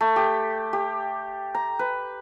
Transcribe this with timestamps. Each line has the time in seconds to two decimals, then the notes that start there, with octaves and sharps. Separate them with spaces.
0.01 A3
0.16 G4
0.73 G4
1.55 A#5
1.79 B4